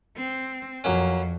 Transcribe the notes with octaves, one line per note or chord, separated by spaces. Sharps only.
C4
F2 F#3 A#3 C#4